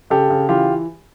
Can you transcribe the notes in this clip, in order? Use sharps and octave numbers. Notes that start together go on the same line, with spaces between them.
C#3 G4 A4
C#3
E3 F4 G4